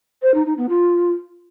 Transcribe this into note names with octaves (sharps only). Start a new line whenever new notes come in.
C5
D#4
D#4
B3
F4